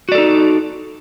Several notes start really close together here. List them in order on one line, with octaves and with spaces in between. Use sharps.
F#4 D5 A4 D#4